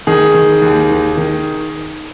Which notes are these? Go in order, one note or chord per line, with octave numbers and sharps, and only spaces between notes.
D#3 G#4
D#3
D#2
D#3
D#3